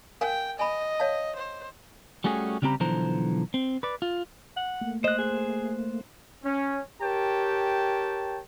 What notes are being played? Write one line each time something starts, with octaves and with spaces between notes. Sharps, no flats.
A#4 F5 G5 G#5
D#5 G#5 B5
C#5 F5 A5
C5
G3 A3 C#4 F#4 G#4
C#3 G3 C4 G4 A#5 B5
B1 D3 E3 F3 C5 A#5
C4
B4 D5
F4
F#5
A3 A#3
C5 D#5 F#6
G#4
C#4
G4 A#4 C#5 G5 A5